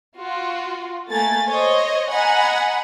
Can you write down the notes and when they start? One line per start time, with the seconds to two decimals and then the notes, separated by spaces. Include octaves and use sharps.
0.17 F4 F#4
1.10 A3 A#3 G#5 A6
1.50 C5 C#5 D#5
2.10 D#5 F#5 G#5 A#5 B5